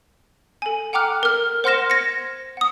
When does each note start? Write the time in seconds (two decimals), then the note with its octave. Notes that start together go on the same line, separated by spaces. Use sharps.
0.62 A4 G#5
0.93 F#5 G5 A#5 D6 F6 F#6
1.23 A#4 F6
1.64 C5 F#5 C6 F6 A#6 E7
1.90 G#6 A#6 C#7
2.57 F#5 D#6